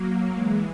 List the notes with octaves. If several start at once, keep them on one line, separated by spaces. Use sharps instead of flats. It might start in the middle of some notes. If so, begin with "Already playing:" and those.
Already playing: F#3 A#3
E3 G#3